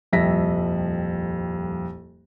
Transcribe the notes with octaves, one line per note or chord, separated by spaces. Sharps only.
D#1 C2 F2 E5 A#6 B6